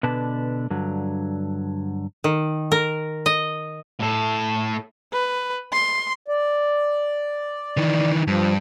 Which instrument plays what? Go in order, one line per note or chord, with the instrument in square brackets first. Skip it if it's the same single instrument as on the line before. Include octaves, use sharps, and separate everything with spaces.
[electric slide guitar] B2 D3 D4 B4 A5
G2 D3 F#3
[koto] D#3
A#4
D#5
[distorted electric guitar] A2 A4
[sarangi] B4
C6
[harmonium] D5
[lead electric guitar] D#3 E3
[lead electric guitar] G2 [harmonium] F3